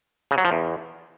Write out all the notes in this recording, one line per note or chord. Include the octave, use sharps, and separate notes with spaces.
C#3
F#3
F3
E2